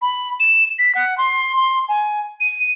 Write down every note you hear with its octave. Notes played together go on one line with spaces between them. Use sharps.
B5
E7
B6
F#5
C6
C6
G#5
D#7